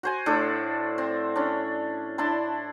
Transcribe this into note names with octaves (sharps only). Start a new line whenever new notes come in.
F#4 C5 G#5
A2 D4 A4 D6
C4
C#4 D4
D4 E4 A5 C6